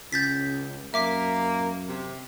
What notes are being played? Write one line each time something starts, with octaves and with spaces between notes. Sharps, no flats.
C#2 C#3 G6 A6 B6
F#2 A#3 E5 D6 B6
C3